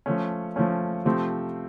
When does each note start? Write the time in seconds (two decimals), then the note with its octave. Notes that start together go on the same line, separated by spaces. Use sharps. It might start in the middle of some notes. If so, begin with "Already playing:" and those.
0.06 F3 A3 C#4
0.56 F3 A3 C#4
1.05 C3 F3 A3 C4